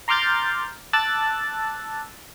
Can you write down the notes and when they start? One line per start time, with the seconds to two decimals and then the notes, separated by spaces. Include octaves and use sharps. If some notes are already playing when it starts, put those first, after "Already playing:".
0.08 A#5 C6 D6 F6 G6 A6
0.93 A5 D6 E6 F#6 A6